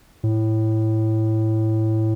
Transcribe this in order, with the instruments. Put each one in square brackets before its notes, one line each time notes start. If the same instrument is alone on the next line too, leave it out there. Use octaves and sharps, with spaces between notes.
[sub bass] A2